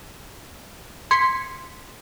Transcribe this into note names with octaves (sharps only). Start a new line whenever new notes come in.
C6 G#6 B6 C#7